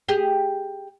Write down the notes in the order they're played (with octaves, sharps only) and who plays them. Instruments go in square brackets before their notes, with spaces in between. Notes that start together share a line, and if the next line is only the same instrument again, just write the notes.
[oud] G4 G#4